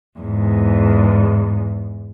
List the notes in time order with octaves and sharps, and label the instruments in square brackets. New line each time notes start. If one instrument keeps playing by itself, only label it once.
[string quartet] E2 G#2